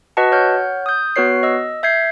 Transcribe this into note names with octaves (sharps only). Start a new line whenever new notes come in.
F#4 B4 D#5 F#5 A5
C#5 F#5 F6 G6
D#6 G6
B3 F#4 B4 C#5 C7
D#5 E6
E5 G6 G#6 C7